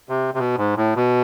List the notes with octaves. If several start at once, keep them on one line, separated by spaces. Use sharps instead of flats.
C3
C3
B2
G#2
A2
B2